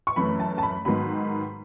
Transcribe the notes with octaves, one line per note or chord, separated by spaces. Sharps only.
C#6
F#2 E3 A3 B5
A5
A5
B5
G#2 D#3 F#3 B3 B5